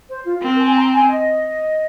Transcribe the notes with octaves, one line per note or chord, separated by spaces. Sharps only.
C5
F4
C4 A#4
G#5
A#5
G#5
D#5